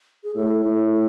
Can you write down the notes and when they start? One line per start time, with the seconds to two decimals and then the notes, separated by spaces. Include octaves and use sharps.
0.24 G#4
0.35 A2 A4
0.64 A2
0.92 A4